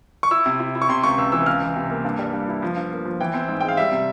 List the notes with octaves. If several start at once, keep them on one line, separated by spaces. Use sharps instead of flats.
C#6
E4 E6
C3
E4
E4
C#6
C3 C6
C#2 C#6
C#2 E6
E3 E6
C#2 F6
E3
C3
A#3
G2
G3
G2
E4
F3
G2
A#3
F3
E3 G5
C4
G#2
G#3 G5
F5
G3 E5
C3